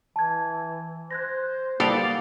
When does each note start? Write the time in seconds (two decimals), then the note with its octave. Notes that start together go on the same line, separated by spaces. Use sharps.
0.16 E3 A5 G#6
1.11 C5 F#6 G#6 A#6
1.80 G3 A#3 B3 A4 D5 C7 F7 G7